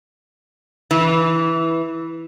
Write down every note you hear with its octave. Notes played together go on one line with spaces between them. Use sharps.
E3